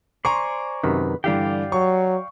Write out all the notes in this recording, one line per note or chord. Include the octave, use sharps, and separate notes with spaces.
C5 D5 G#5 A#5 C6 C#6
F#2 C3 D#3 B4
G2 D3 E3 G4 D5 F5 G5
F#3 C#6